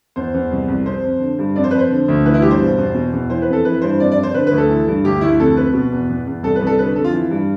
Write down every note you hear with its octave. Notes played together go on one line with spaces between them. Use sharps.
E2 C5
E2
C2
C2
F2 C5
F2
D3
G2
F2 D5
C5
F2 B4
C5
D3
D2
E3 B4
E4
G2 G4
C5
B2
E2
B2
E2
E3 C5
B4
F2 A4
E3 B4
G2 C5
F2 D5
D5
F2
C5
D3 B4
B4
D2
A4
E3
G2
D2 G4
D2 E4
F2 A4
F2 B4
B2
E2
E2
E2
C2 A4
B4
C2
A4
D3 B4
F2 A4
F4
E3
G2